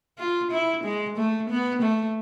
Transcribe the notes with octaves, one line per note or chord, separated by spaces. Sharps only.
F4
E4
G#3
A3
B3
A3